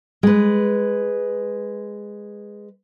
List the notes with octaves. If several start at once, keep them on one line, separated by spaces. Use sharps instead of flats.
G#3 B4